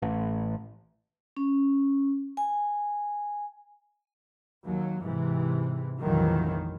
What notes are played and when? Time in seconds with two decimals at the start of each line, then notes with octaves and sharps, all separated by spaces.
0.02 A1
1.37 C#4
2.37 G#5
4.65 D#2 F#3
5.03 G#2 C3 E3
6.00 F1 A#1 F2 D#3 E3 F#3